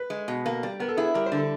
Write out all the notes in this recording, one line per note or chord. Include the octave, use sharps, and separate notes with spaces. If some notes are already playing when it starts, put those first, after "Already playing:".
Already playing: B4
G#3
B2
A#3
G3
B3 A#4
A4
E4 G#4
G3 A#4
C5
D3
A4